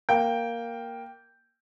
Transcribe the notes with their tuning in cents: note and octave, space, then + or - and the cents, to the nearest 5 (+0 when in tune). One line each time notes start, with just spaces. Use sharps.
A#3 +0 G5 +0